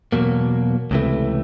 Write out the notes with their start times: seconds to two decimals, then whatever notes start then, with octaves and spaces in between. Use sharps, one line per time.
0.12 E2 B2 F#3 A#3
0.91 C#2 C3 E3 A3